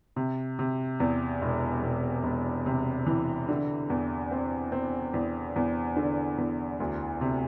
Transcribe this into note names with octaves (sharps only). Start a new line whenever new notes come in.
C3
C3
E2
E1
E1
E1
C3
E3
D3
E2
C4
C4
E2
E2
D3
E2
D2
C3